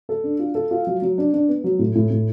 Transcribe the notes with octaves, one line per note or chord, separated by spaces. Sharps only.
A4
D4
F4
A4
F4
F#3
F#3
D4
D4
B3
F#3
A2
A2
A2